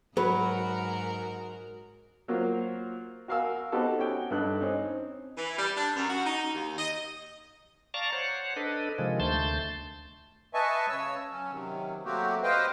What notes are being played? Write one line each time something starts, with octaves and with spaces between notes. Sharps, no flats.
G#2 F#3 F#4 A#4 B4
F#3 A#3 F4 F#4 A#4 C5
F#4 A#4 F5 G#5 E6
B3 C4 D#4 F#4 G4 A4
C#4 F#4 G5
G2 D#4 A4 F#6
C4 C#4 D#4
E3
G3
D4
F#2
F#4
D#4
D#2
D#5
D5 F5 A5 A#5 C#6
C5 C#5 F#5
D4 A4 B4 D#5
C3 D#3 F3 G#3
D2 A3 A5 C6 G6
B4 D#5 E5 G#5 A5 C#6
C#3 C#5 E6
F#3 C#4
C3 D#3 F#3
F#3 A3 A#3 C4 F#4 G4
B4 C5 D#5 F5 G5